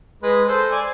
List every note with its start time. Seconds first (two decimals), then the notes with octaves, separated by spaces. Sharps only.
0.23 G#3 B4
0.48 A4 C5
0.71 D5 G#5